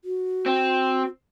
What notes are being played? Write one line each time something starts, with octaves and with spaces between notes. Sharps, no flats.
F#4
C4